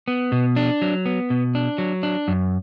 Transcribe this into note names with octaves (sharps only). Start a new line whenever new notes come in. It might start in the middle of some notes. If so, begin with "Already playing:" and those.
B3
B2
D4
F#3
B3
B2
D4
F#3
D4
F#2